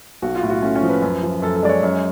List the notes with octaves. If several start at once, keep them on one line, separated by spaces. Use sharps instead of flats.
B1 F#4
F4
A2
F#4
A3 C#4
C#4
F3
B4
F#2
F3
F#2 A4
A4
G#3 D5
C#5
F#2